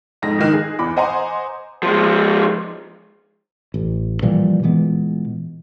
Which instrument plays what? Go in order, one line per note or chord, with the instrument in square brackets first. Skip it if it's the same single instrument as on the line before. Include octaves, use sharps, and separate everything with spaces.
[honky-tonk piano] F2 G#2 A#6
C#2 D#3 F#6
G#4
E2 B5 D6
C5 D#5 F#5 G#5 A#5 C6
[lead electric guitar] F3 G#3
[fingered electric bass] A1
A#2 E3 F3 G3
A#2 E3 G#3 B3